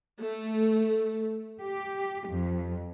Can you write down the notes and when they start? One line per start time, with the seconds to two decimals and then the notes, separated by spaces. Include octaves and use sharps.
0.21 A3
1.61 G4
2.27 F2